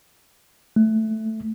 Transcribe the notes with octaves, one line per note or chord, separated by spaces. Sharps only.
A3